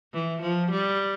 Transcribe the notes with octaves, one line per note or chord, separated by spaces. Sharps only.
E3
F3
G3